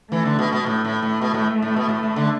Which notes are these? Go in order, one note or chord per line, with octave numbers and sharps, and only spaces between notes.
E3 A3
D3
B2
B2
A2 A3
A2
A2
B2
A2
A2
B2
A2
A2
D3